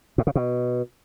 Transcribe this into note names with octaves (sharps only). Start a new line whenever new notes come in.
A2
C#3
B2